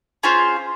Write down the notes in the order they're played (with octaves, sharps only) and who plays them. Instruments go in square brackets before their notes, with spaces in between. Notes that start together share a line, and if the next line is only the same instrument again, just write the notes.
[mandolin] C#4 F4 G#4 C5